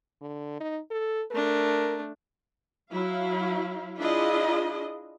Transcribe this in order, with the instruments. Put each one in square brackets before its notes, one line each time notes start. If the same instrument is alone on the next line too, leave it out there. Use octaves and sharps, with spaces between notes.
[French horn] D3
D#4
A4
[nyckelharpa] A3 D4 [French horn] A#4
[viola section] F#3 E4 F5
D4 E4 F4 G#4 D#5